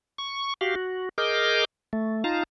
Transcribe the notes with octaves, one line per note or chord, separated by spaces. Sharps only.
C#6
F#4 G4 F5
F#4
G#4 A#4 D#5 D6 F6 G6
A3
D#4 F4 F5 A5 A#5